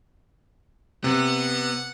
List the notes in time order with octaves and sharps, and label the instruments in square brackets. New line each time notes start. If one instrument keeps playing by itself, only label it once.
[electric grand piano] C3 [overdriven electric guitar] B3 [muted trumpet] F#5